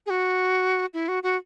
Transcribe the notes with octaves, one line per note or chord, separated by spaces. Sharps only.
G#4
F#4
E4
F#4
F#4